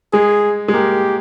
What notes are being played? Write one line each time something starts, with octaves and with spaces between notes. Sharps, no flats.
G#3 G#4
G#3
A#3 G4